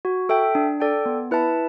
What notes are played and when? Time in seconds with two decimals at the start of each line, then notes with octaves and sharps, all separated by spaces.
0.05 F#4
0.29 A4 E5 G5
0.55 D4
0.80 A4 D5 G5
1.06 B3
1.31 E4 B4 E5 A5